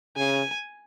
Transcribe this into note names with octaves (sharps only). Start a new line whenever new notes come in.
C#3 G#5